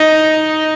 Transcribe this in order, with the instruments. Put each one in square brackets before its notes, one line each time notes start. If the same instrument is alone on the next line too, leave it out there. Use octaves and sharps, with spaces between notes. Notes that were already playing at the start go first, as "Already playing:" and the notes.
Already playing: [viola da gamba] D#4